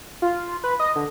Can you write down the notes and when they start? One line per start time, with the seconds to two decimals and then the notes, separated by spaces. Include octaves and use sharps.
0.22 F4
0.64 B4
0.80 D#5
0.96 D3